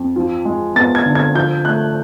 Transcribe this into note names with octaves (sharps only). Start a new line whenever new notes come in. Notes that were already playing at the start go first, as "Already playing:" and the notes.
Already playing: F2
F3
G#3
B3 A6
G#6
D3
G#6
F3 G6
A3 F#6